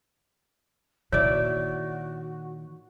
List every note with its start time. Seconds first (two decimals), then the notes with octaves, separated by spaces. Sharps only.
1.12 A#2 D#3 E4 F#4 C#5 D5